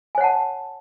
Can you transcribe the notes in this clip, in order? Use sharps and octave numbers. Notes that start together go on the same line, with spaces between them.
C#5 F#5 G#5 A5